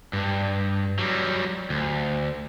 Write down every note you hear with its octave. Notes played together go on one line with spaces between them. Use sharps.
G2
F#3 G3
D2